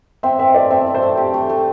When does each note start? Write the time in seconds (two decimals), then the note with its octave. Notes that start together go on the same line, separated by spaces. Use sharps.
0.23 C4 C5 E5
0.39 C4 C5 E5
0.54 A3 D5 G5
0.70 C4 C5 E5
0.86 C4
0.95 C5 E5
1.03 A3
1.17 G4
1.34 A3
1.49 A3